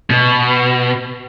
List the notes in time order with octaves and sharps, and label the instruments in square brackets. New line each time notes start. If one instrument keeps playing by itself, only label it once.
[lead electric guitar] B2